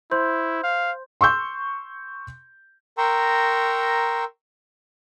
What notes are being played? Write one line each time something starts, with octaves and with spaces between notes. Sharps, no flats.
E4 C5 C6 G6
F5
C6 C#6 E6 G6
A#4 G5 A#5 C6 C#6 E6